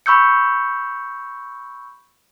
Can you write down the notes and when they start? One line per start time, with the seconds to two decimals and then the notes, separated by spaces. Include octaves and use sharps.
0.06 B5 C#6 E6 G6 C#7